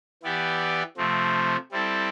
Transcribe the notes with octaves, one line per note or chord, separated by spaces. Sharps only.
E3 B3 E4 G4 D5
C3 F3 A3 C4
G3 C4 E4 A4